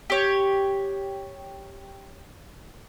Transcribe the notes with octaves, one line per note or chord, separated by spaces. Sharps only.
G4 C#5